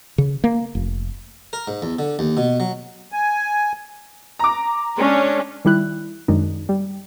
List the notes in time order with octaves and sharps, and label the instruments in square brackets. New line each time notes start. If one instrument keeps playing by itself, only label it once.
[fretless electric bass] C#3
A#3
F1
[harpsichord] A#4
G#2
E2
D3
D#2
B2
F#3
[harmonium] G#5
[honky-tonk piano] A#5 D6
[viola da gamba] G#3 D4 [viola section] C#4
[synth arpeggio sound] D#3 G3 E4 F#6
F#2 D#3 G#3 D4 D#4
G3